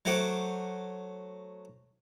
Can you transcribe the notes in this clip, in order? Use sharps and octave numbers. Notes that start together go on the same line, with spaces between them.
F#3 A3 C5 F#5 D6